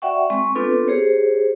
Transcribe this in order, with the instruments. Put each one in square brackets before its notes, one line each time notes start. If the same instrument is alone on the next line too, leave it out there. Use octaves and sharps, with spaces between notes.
[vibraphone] F#4 D5 E5 F#5 G5 C#6
G#3 C4 C#6
B3 C4 D4 F4 A4 B4
G4 G#4 C5 C#5